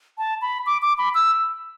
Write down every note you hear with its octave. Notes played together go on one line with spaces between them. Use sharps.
A5
B5
D6
D6
B5
E6